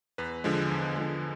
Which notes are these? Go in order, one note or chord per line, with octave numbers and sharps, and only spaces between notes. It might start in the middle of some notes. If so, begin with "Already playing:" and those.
E2 B4
D3 F3 G#3
E2
D3 F3 G#3